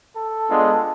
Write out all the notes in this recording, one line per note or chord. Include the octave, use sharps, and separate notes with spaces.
A4
G#3 B3 D4 F4